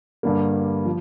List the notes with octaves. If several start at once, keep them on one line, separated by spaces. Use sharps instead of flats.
G2 D3 G3 A#3
F3